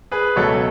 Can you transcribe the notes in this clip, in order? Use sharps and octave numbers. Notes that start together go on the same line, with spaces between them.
G#4 B4
C#2 B2 F#3 A3 A4 C#5